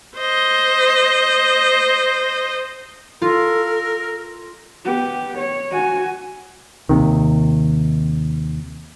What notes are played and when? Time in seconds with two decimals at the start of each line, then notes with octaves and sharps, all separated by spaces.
0.17 C5 D#5
3.22 F4 A4 A#4
4.85 B3 G4
5.38 C#5
5.71 F#4 G#5
6.89 D#2 C3 D#3